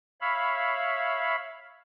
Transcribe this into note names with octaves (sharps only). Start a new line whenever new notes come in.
C#5 E5 F5 B5